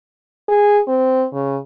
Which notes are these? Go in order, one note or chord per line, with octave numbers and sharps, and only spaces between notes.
G#4
C4
C#3